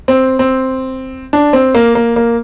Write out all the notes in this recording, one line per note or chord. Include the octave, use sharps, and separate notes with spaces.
C4
C4
D4
C4
A#3
A#3
A#3